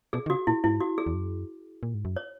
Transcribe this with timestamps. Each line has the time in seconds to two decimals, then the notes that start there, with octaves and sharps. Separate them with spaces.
0.13 B2 G#4
0.26 D#3
0.30 C#3 F#4
0.47 A#2 E4
0.64 G#2 E4
0.80 F#4
0.98 G#4
1.07 E2
1.14 F#2
1.83 A#2
1.94 G#2
2.05 F#2
2.16 C#5